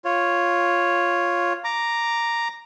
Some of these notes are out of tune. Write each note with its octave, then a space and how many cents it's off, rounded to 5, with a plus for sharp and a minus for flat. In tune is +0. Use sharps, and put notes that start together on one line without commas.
F4 +0 C#5 +0
A#5 +0 D6 +0